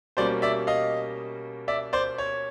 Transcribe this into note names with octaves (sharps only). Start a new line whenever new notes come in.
B2 G3 A#3 C#4 C5 D5
D5 E5
D#5 F5
D5 E5
C5 D5
C#5